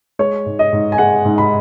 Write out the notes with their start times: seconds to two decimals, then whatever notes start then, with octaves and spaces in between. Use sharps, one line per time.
0.19 G#3 C#5
0.46 G#2
0.59 D#5
0.73 G#2
0.92 G#5
0.98 G#3 F#5
1.25 G#2
1.38 B5